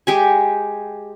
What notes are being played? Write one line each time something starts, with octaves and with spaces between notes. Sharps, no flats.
G#3 G4 G#5